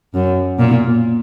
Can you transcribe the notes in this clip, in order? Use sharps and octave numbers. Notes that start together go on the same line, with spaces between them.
F#2
A#2